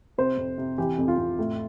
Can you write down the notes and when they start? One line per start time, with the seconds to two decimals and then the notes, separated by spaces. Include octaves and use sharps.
0.18 C3 C5
0.37 F2
0.58 C3
0.78 E3 G4
0.98 F2
1.08 F4
1.18 F2
1.39 A2